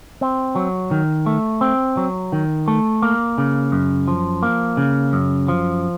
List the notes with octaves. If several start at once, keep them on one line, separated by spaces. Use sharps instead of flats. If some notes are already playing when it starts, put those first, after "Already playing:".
C4
F#3
D#3
A3
C4
F#3
D#3
A3
A#3
C#3
F#2
F3
A#3
C#3
F#2
F3